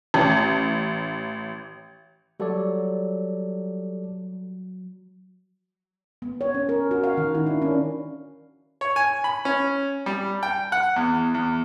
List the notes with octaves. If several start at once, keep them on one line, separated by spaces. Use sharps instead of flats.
A1
F#3 G3 A4 D5
B3
C#5
C#4
A#4
F#4
F5
D#3
E4
D4
C#4
C#5
G#5
B5
C#4
G3
G5
F#5
E2
E2